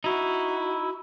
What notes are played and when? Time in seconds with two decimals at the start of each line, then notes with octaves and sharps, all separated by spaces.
0.04 D#4 E4 F#4